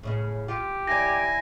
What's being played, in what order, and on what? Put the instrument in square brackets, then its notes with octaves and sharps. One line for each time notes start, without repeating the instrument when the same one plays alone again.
[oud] A2 C#3 C#4
[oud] F4 [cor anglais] G4
[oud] D#2 D5 [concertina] E4 G#5 [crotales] A#6